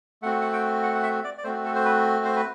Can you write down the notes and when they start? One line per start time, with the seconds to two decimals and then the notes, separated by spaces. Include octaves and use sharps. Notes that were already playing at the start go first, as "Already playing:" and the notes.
0.22 A3 C4 F#4 F#5
0.41 F#5
0.53 G5
0.83 F#5
0.95 F#5
1.03 E5
1.24 D5
1.38 D5
1.44 A3 C4 F#4 C5
1.65 A4
1.75 C5
1.85 B4
2.25 C5
2.36 B4